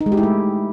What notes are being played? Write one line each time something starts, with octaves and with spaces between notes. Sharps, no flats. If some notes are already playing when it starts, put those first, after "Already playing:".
D#4
G#3
G4
E4
A3